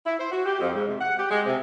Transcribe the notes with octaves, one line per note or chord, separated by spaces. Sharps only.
E4
C5
F#4
G4
F2
G#2
C3
F#5
G4
G#3
C3